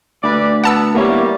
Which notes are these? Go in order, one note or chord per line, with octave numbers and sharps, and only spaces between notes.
D2 B4 D5
B3 F#5 A5 E6
G3 A#3 B3 E4 C#5